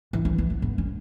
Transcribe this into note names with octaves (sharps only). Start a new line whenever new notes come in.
E3
C#4
B3
B3
B3
C#4